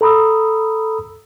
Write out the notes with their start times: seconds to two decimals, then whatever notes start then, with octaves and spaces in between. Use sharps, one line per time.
0.01 A4 A#5 B5 D#6 E6